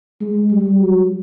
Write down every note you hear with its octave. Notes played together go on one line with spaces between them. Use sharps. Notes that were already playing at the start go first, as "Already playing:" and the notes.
G#3
G3
F#3